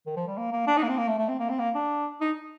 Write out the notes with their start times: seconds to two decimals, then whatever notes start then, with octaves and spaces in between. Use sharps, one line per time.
0.06 D#3
0.16 F3
0.27 G3
0.37 A#3
0.52 A#3
0.67 D4
0.77 D#4
0.83 A#3
0.88 C4
0.98 A#3
1.08 A3
1.18 A3
1.29 C4
1.39 A#3
1.49 C4
1.59 A#3
1.75 D4
2.21 D#4